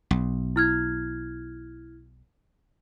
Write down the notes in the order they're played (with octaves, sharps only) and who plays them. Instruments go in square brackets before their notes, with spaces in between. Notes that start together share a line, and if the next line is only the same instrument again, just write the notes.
[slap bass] B1
[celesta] E4 F6 G#6